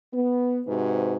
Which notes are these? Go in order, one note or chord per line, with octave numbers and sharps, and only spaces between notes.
B3
G#2 C3 F#4 B4